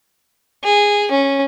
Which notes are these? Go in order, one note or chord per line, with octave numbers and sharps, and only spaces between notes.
G#4
C#4